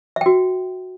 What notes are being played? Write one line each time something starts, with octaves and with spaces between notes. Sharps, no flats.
F#4 E5 G5